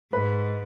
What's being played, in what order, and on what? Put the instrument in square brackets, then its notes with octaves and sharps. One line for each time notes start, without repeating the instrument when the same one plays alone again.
[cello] G#2 [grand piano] B4 B5